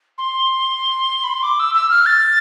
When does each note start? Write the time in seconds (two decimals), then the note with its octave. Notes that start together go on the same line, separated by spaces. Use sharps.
0.18 C6
1.24 B5
1.34 C6
1.43 D6
1.59 E6
1.74 E6
1.90 F6
2.06 A6